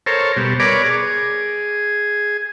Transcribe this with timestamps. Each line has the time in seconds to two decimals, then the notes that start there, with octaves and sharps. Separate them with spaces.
0.06 A4 A#4 C5 C#5
0.37 B2 G3
0.60 A#4 B4 C#5 D5 G#5 D6
0.85 G#4